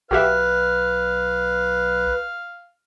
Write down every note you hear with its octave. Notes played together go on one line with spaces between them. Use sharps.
B1 F#4 G4 B4 E5 F5